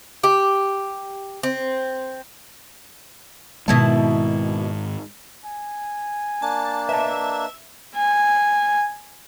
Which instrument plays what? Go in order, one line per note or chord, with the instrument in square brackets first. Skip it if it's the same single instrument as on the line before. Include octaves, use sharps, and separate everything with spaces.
[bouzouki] G4
C4
[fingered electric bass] G#2 D#3 G#3 [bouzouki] B2 E4 A5
[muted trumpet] G#5
[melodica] A#3 D4 [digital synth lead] A5
[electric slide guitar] B4 D#5 A5 [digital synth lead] E5
[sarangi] G#5